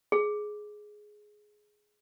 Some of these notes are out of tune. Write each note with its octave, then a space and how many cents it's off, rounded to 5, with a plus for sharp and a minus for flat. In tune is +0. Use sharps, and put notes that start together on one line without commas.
G#4 +10